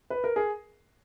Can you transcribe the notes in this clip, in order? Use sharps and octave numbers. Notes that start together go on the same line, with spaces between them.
B4
A#4
G#4